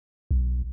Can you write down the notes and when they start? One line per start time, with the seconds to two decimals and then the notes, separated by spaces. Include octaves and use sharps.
0.31 B1